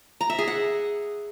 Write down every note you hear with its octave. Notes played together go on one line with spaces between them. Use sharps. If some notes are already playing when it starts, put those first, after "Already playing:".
A#5
E5
G#4
F#5